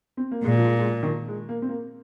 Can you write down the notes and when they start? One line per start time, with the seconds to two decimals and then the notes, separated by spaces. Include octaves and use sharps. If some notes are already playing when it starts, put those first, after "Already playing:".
0.17 C4
0.31 A#3
0.44 A#2 G#3
0.58 F3
0.64 G#3
0.79 G#3
0.85 F3
1.03 D#3
1.06 F3
1.28 G#3
1.49 A#3
1.62 C4
1.69 A#3